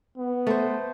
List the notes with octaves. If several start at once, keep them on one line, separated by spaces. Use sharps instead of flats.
B3
A3 C5